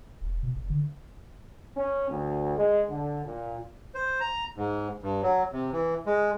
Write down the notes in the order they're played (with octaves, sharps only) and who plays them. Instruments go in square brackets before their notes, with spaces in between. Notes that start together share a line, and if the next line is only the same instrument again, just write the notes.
[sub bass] E1
B2
F#1
D3
[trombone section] C#4
D2
G#3
D3
A#2
[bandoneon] C5
A#5
G#2
G2
F#3
C3
E3
G#3